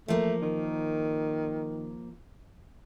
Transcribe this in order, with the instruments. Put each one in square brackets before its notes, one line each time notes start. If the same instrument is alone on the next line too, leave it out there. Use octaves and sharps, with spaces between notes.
[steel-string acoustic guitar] F3 A#3 [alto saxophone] A3
[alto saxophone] D#3